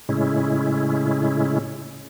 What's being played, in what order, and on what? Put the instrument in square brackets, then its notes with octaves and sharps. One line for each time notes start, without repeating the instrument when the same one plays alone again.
[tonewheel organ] A2 C#3 G#3 C#4 E4